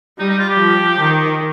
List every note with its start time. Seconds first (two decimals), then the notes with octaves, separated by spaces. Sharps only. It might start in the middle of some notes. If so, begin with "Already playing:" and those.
0.19 G3 D#4
0.29 D#4
0.39 F4
0.49 G4
0.60 F3
1.00 D#3